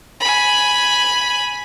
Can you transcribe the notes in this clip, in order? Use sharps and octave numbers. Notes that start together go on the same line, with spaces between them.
G#5 B5